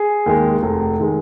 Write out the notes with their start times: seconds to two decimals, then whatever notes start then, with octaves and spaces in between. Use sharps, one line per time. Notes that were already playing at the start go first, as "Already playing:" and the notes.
Already playing: G#4
0.26 D#2 D#3 G#3
0.63 F1
1.00 D#3 G#3